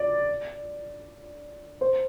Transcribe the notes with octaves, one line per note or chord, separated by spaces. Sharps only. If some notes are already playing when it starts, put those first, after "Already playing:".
Already playing: D5
C5